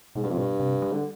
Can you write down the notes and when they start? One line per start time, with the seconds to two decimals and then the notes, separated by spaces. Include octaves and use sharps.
0.15 G#2 B2
0.23 G2
0.30 F2
0.38 G2 B2
0.60 C3
0.82 G3
0.93 D3